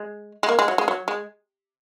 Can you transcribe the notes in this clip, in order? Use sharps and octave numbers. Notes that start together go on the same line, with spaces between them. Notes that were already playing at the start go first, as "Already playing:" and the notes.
Already playing: G#3
G#3
A#3
G#3
F#3
G#3
F#3
G#3